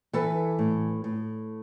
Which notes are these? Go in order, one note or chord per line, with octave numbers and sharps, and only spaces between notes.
E3 A4 B4
A2
A2